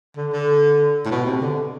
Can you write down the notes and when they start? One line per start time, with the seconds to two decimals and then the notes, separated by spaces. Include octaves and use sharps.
0.16 D3
0.32 D3
1.06 A2
1.11 B2
1.26 C3
1.41 D3